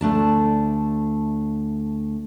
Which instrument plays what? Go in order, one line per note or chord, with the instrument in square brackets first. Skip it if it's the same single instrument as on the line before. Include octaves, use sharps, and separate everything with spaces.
[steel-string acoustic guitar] D2 A3 D4 A5